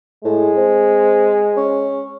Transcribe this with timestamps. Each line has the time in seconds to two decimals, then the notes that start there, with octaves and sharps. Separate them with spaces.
0.24 A2 G#3
0.56 C4
1.57 C#4